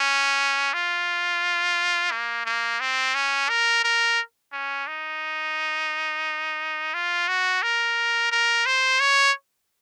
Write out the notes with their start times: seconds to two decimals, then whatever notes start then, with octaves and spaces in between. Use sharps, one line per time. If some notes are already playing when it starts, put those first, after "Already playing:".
Already playing: C#4
0.74 F4
2.11 A#3
2.46 A#3
2.80 C4
3.15 C#4
3.49 A#4
3.84 A#4
4.52 C#4
4.87 D#4
6.94 F4
7.28 F#4
7.63 A#4
8.32 A#4
8.66 C5
9.00 C#5